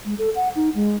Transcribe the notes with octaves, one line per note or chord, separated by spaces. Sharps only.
G#3
A4
F#5
D#4
G#3